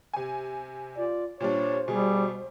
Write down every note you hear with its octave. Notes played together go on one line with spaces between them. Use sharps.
C3 G#5
F4 D5
A#2 G3 D4 C5 C#5
B2 G3 G#4